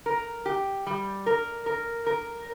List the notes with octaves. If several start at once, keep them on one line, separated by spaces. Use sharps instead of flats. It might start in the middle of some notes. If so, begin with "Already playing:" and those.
A#4
G4
G3
A#4
A#4
A#4